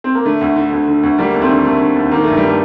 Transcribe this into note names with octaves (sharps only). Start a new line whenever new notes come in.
C4
A#3
D3 A3
D2
D3
D2
D3
D2
D3 G3 A#3
D#2
A3 C4
D3
D#2 A3
D3
D#2
D#3 A#3
G2 A3
G3
D#3
A3